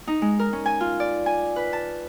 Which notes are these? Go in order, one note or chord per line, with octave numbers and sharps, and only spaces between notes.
D#4
G#3
A#4
C#4
G#5
F4
D5
G#5
B4
A5